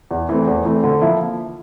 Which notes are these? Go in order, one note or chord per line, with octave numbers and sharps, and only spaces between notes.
E2
E3 A3 C4
E2
E3 A3 C4
D3
F3 A#3 E4